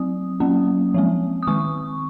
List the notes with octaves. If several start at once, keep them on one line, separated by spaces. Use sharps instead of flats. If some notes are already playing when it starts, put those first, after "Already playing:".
Already playing: F#3 C4 D#6
F#3 A#3 C#4
F3 G#3 C4
D#6
D#3 G#3 C4 C#6